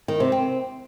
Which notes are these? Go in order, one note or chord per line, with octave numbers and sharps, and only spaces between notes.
D#3
C3
C4